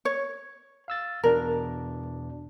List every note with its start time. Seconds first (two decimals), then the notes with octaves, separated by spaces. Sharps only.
0.05 C#5
0.88 F5 E6 A6
1.23 E2 B2 D4 A#4